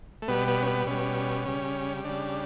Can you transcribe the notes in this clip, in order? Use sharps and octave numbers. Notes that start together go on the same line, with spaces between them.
A3
B2 G3 B3
B3
C#4
B3
B2 G3 C#4
C#3 G3
C#3 G3 D4